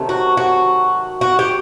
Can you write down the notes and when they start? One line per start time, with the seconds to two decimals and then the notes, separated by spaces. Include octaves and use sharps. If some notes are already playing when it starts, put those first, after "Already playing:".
Already playing: C3 D#3 F#3 A3
0.09 F#4
0.37 F#4
1.21 F#4
1.39 G4